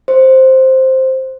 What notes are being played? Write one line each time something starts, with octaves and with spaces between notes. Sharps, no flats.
C5